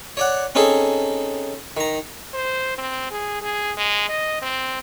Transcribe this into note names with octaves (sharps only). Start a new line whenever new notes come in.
C#5 D5 F#5
C4 C#4 D#4 G#4 A4
D#3 A#5
C5
C4
G#4
G#4
G#3
D#5
C4